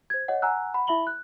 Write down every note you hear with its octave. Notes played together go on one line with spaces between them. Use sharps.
C5 G#6
C#5 D#5 F#5
F#5 G#5 A#5 E6 F#6
F#5 B5
E4 E5 B5 F#7 G7
F#6